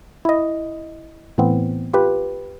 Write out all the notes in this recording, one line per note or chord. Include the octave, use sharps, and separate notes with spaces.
E4 D#5
A2 E3 B3 C4
F4 G4 B4